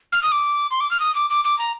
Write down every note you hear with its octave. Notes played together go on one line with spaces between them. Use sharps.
F6
D#6
D6
C6
D6
F6
D#6
D6
D6
D6
A#5